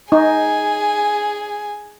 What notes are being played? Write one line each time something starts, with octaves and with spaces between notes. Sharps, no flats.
D#4 G#4 G#5